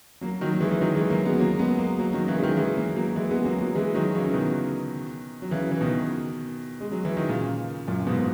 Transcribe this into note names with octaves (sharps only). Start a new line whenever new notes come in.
F#3 A#3
D#3 F#3
F#3
E3 G#3
E3
D#3 F#3
E3 G#3
F#3 A#3
G#3 B3
F#3 A#3
G#3 B3
F#3 A#3
F#3 A#3
D#3 F#3
C#3 E3
G#3
D#3 F#3
E3 G#3
F#3 A#3
F#3 A#3
E3 G#3
G#3 B3
F#3 A#3
F#3 A#3
E3 G#3
D#3 F#3
C#3 E3
C#3
B2 D#3
F#3
C#3 E3
E3
B2 D#3
G#3
F#3
E3
D#3
A#2 C#3
F#2 A#2
G#2 B2